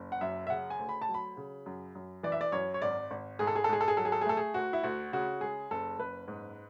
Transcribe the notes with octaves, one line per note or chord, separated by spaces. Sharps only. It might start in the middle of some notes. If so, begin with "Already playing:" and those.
Already playing: F#1
F#5
F#2 E5
E5
C#3 F#5
G#5
D2
B5
A5
F#3
B5
C#3
F#2
F#2
E3 D5
E5
D5
F#2 C#5
C#5
G#1 D5
G#1
G#2 G#4
A4
G#4
A4
G#2 G#4
A4
G#4
F#3 A4
G#4
A4
G#4
A3 A4
G#4
D2 F#4
E4
D2 F#4
C#3 F#4
G#3 G#4
F#1 A4
F#1 B4
G#2